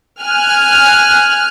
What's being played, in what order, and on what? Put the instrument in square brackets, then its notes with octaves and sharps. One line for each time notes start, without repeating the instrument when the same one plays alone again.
[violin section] G#5 F6 F#6